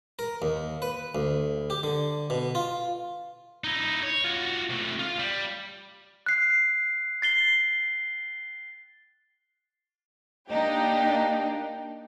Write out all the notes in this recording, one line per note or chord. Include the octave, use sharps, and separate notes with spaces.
A#4
D#2
B4
D2
G4
D3
B2
F4
D#4 E4
C#5
F4 F#4
C3 A3
F4
G3
F#6 C7
A6 C7 G7
A#3 D4 D#4 G4